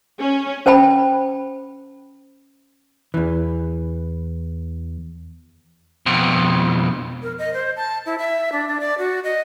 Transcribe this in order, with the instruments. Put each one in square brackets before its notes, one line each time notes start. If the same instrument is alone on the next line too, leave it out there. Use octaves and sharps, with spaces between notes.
[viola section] C#4
[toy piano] C#4 C5 G5 A5 B5
[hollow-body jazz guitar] E2 E3
[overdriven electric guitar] F2 B2
[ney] A#4
D#5
C5
A5
E4
E5
D4
D4
D5
F#4
D#5